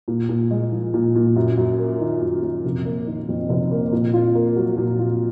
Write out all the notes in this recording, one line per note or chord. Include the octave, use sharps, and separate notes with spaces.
A#2
A#2
G#3
F3
A#2
A#2
F#2
F#2
A#3
D#3
F#2
F#2
F1
A#3
D#3
F2
F1
A#3
A#2
F4
A#3
F#3
A#2
F4